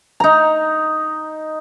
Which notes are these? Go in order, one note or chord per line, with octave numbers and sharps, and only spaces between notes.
D#4 A#5